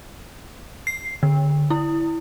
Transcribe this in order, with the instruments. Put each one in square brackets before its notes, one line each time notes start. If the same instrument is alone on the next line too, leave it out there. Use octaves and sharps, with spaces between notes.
[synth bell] C7
D3
E4